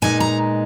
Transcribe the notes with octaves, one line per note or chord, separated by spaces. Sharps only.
A#2 G#3 B3 D#4 G#5
A#5